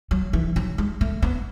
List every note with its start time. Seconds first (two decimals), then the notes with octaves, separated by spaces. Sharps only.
0.11 F#3
0.33 E3
0.56 F#3
0.78 G#3
1.01 A3
1.22 B3